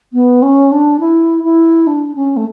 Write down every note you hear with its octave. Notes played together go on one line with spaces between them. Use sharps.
B3
C#4
D4
E4
E4
D4
C#4
A3